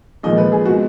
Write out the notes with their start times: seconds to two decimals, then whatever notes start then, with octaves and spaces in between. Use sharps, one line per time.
0.23 A#2 F3 G#3 D#5
0.38 B4
0.52 G#4
0.66 B2 G#3 F#4